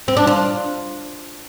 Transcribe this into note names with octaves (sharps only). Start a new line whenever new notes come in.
C4
D4
F4